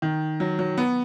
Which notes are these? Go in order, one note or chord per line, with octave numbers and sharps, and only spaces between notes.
D#3
F#3
F#3
B3